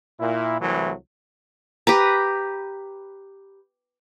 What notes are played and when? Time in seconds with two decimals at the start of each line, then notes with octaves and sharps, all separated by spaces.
0.19 A#2 E4
0.59 C2 E3 F#3 A3
1.87 G4 B4 A#5